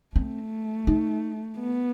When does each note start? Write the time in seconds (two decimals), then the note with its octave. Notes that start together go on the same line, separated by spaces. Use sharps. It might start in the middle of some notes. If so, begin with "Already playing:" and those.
0.16 A3 C4
0.87 D#4
1.59 B3